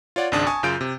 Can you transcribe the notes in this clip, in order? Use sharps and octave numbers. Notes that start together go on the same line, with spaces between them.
F4 C#5 D5 F#5
G#1 C#2 G#2 D4 A5 D#6
G#5 A5 C#6 D#6
F#2 C#3 F4 G6 D7
C3